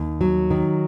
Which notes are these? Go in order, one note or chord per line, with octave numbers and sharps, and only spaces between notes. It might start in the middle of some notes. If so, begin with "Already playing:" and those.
Already playing: D#2
F#3
D#3